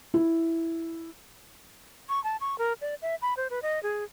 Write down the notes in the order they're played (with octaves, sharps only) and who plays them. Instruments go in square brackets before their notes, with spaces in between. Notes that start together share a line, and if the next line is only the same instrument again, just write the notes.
[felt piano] E4
[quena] C#6
A5
C#6
A#4
D5
E5
B5
C5
B4
D#5
G#4